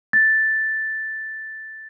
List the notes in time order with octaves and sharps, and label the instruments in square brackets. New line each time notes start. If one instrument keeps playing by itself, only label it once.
[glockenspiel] A6